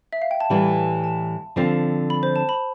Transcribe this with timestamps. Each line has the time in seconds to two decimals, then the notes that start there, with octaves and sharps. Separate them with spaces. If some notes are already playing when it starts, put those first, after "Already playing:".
0.13 E5
0.22 F5
0.31 G5
0.40 A5
0.50 A2 E3 G3 B5
0.76 A5
1.04 A5
1.56 D3 F3 C4 F4
2.10 B5
2.23 C5
2.36 A5
2.49 B5